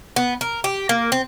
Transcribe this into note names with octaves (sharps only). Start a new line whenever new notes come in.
B3
A#4
G4
A#3
C4